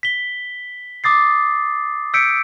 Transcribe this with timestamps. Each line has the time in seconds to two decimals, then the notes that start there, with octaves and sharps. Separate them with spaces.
0.03 B6 G7
1.04 D6 D#6 A6 C7
2.14 E6 G6 B6 C#7 D7